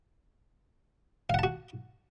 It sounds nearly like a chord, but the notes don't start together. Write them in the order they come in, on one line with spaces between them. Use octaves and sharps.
F5 F#5 A5 F#4